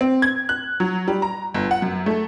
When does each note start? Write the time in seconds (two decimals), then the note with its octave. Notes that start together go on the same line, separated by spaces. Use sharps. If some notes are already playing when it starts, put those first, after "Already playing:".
0.01 C4
0.22 G#6
0.49 F#6
0.80 F#3
1.08 G3
1.22 A#5
1.55 G1
1.71 F#5
1.82 F#2
2.06 A3